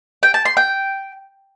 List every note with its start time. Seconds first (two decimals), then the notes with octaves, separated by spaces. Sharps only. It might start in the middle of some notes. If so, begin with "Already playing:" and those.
0.23 G5
0.34 A5
0.45 C6
0.57 G5